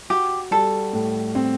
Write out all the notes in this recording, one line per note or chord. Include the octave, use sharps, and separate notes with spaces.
F#4 G4
G3 A4
A2
C4